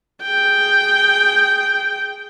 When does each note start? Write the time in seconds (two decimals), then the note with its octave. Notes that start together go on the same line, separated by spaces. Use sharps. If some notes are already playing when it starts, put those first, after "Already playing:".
0.23 G#4 G5